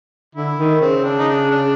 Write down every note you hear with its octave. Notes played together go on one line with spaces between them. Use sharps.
D3 E4
D#3
C#3 C4
D4
D#4
D4
D4